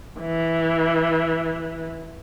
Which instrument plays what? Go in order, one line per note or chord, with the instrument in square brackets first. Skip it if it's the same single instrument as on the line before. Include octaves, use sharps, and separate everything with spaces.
[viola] E3